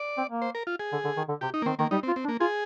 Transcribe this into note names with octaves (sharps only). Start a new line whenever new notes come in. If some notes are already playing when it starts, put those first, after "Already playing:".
Already playing: D5
C4
A#3
C5
A#4
F4
G#4
D3
D3
D#3
D3
C3 G4
D#4
A#3
D#3 C4
D#3 A#3
G3 D#4
C4
F4
C4
D4
A#3
F4 G#4